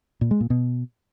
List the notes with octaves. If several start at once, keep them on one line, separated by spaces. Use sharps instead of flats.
A#2
G#3
A#2
B2